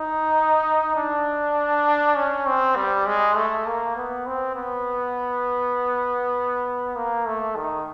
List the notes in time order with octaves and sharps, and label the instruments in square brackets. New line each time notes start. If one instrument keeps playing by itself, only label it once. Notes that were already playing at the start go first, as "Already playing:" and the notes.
Already playing: [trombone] D#4
D4
C#4
C4
G3
G#3
A3
A#3
B3
C4
B3
A#3
A3
D#3